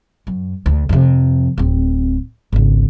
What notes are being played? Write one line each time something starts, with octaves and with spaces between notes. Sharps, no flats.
F#2
D2
F2 C3
D1 C4
G#1 C#2